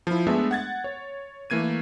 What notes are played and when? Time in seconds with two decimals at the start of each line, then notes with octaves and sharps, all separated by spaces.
0.07 F3 E4
0.27 G#3 A3 B3 D4 E5
0.51 F#5 G#6 A6
0.84 C#5
1.50 E3 A3 A#3 G#6 D#7